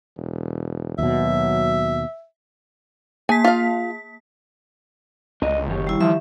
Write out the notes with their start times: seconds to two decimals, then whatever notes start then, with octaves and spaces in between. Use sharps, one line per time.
0.17 E1
0.98 D#2 B2 F#3 E5
3.29 A#3 G#5 B6
3.44 F4 F5
5.42 C#2 D4 D#5
5.68 F#1 D#3 G4 C#5
5.87 G3 E4
6.01 F3 E5